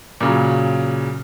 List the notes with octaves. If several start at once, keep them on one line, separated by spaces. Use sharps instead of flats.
A#2 C#3 F#3